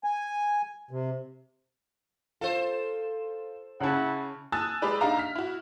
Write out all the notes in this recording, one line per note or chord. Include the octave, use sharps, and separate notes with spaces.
G#5
C3
F4 A4 C5
C#3 C#4 E4 F#5 A5
G#5 A5 D#6 E6 F#6 A6
G#3 G4 B4 D5
D4 D#4 G4 E5 F5 A#5
F6 B6
E4 F#4